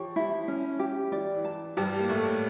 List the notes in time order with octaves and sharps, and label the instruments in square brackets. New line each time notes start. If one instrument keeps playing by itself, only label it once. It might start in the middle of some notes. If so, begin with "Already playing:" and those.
Already playing: [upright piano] E3 F3 [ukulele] G4 C#5
[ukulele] E4
C#4
G4
[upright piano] E3 [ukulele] D5
[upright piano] E3
[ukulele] A5
[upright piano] G2 G3 [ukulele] G4
[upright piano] A#3
[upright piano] A2 A3 [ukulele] C#5